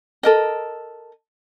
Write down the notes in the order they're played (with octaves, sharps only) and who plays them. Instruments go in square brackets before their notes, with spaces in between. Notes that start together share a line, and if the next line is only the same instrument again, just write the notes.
[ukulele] A4 A#4 D#5